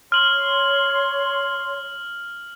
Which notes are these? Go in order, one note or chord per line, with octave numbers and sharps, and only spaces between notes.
C#5 C6 F6 F#7